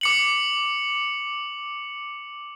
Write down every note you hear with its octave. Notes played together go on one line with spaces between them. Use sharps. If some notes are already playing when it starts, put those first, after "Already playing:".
D6 C#7 F#7